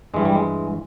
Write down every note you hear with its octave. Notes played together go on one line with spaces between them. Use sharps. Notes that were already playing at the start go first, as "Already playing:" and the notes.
G2 E3 G3 G#3
G3
G#3